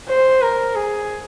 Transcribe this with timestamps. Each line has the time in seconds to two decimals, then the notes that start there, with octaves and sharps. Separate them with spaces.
0.09 C5
0.42 A#4
0.75 G#4